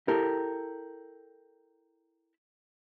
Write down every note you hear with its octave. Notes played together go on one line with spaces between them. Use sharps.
E4 G4 A4 A#4